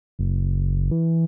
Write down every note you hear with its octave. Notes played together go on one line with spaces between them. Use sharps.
F#1
E3